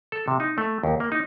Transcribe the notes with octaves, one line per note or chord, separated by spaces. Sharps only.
A4
C3
D#4
A3
D#2
A#3
D#4